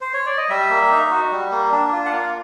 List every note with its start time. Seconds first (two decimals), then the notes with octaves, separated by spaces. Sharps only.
0.01 C5
0.14 C#5
0.26 D5
0.38 D#5
0.49 G3 E5
0.70 A#3
0.91 D#4
1.11 F#4
1.31 G3
1.51 A#3
1.72 D4
1.93 F4
2.05 F#5
2.12 A#3 F5